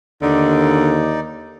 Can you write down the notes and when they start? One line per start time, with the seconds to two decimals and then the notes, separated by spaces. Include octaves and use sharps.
0.22 D#2 D3 D#4 D5